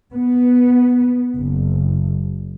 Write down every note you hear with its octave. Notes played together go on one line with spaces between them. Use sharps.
B3
F#1